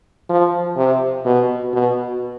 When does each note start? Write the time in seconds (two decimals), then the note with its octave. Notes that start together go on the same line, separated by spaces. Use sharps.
0.29 F3
0.77 C3
1.26 B2
1.73 B2